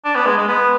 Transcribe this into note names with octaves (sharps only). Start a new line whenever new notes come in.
D4
B3
G#3
G#3
B3